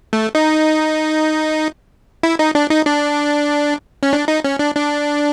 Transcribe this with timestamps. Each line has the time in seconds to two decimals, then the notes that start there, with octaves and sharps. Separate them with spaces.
0.13 A3
0.35 D#4
2.23 E4
2.39 D#4
2.55 D4
2.70 D#4
2.86 D4
4.03 C#4
4.13 D4
4.28 D#4
4.44 C#4
4.59 D4
4.76 D4